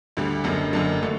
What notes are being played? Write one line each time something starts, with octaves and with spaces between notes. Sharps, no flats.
D2 D3 G3
F#1 F#2 D3
F#1 F#2 D3
D3 A3